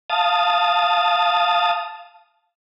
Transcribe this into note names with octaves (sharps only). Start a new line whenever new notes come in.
F5 A5 D#6